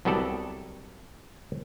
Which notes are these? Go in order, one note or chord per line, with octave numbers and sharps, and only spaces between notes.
C2 F#3 G3 B3 A4 D5